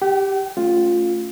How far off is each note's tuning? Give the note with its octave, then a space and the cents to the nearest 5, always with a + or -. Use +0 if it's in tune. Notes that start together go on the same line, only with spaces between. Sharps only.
G4 +0 G5 -45
A3 +0 C#4 +0 F4 +5